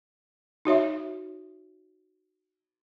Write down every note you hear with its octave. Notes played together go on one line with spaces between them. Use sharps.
D#4 F#4 C#5 E5